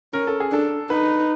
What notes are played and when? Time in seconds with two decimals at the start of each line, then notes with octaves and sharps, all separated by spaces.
0.13 C#4 A#4
0.27 A4
0.40 G#4
0.51 D4 A4
0.90 D#4 B4